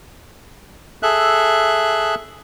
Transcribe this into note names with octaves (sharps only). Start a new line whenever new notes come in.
G#4 A4 E5 F#6